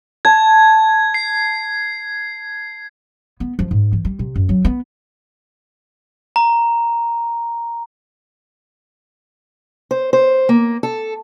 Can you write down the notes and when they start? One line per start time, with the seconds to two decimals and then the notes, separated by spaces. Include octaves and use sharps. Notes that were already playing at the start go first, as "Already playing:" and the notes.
0.25 A5 G#6
1.14 C7
3.40 B3
3.59 F3
3.71 G#2
3.93 E3
4.05 G3
4.19 C3
4.36 F#2
4.49 F#3
4.65 B3
6.36 A#5
9.91 C5
10.13 C5
10.49 A#3
10.83 A4